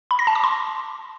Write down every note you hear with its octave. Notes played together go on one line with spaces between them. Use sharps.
B5
A#6
A5
D6
C6